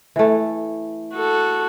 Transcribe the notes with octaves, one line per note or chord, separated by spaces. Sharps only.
E3 A3
F#4 A4